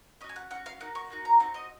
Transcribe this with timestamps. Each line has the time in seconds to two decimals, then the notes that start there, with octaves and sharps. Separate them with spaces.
0.21 C#4 D#5
0.24 F#4
0.29 G#5
0.36 F#5
0.50 C#4 F#5
0.55 F#4
0.66 F5
0.80 A#3 D#4 F#4 F#5
0.95 C#6
1.10 A#3 D#4 F#4
1.25 A#5
1.40 C4 D#4 F#4 F#5
1.54 D#5